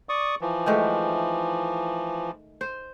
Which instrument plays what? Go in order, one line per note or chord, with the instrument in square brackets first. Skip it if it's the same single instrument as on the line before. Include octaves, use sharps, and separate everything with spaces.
[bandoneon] D5 C#6 D#6
E3 F3
[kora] D#3 G#3 A3
C5